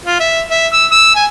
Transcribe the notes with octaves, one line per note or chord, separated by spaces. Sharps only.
F4
E5
E5
E6
E6
G#5